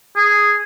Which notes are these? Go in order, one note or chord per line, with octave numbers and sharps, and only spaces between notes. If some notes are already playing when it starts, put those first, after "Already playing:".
G#4